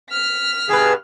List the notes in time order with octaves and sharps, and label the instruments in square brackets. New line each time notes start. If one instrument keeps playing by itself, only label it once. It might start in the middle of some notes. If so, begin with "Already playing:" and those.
[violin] F6 B6
[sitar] G2 B2 B4 [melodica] G#4